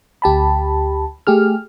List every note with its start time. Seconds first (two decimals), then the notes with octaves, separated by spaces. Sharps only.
0.22 D2 G4 A5 B5
1.27 A3 G4 G#4 F6